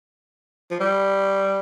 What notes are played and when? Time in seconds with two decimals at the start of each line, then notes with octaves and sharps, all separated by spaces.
0.71 F3
0.80 G3